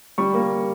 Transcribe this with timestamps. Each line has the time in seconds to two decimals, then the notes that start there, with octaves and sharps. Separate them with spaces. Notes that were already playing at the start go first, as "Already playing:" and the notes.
0.18 G3 C#6
0.34 A#3